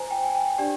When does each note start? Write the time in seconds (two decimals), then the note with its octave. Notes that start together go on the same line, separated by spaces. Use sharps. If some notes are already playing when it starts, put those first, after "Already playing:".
Already playing: F4 C5 G#5 A#5
0.11 G5
0.25 G#5
0.35 G5
0.58 D4 G4 D5